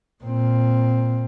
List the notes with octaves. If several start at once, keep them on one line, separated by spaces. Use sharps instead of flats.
A#2 C4